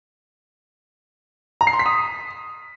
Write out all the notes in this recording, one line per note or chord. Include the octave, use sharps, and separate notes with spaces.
A#5
C7
C6
B6
D#6